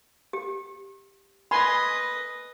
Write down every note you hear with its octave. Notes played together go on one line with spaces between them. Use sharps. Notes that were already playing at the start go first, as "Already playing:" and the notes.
G4
B4 D#5 G#5 B5 C6